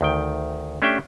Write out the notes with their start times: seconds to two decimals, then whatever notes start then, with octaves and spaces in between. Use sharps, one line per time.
0.01 D2 D#3 G5
0.82 A3 C#4 D4 G4 E5 G5